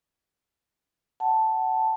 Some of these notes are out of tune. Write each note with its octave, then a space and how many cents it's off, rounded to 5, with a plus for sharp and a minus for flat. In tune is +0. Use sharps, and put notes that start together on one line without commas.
F#5 +20 A5 +0